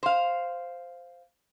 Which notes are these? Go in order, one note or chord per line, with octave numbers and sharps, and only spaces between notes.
C5 F5